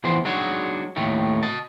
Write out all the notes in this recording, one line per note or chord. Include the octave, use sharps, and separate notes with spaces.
E2 E3 F3 B3 C5
F#3 G#3 D4 D#4 F#4 C#5
D#2 A2 D#3 A3
D#5 A5